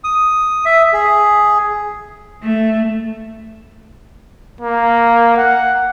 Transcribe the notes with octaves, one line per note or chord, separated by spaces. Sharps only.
D#6
E5
G#4
A3
A#3
F#5